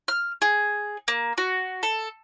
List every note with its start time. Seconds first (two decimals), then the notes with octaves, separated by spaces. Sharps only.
0.08 F6
0.42 G#4
1.08 A#3
1.38 F#4
1.83 A4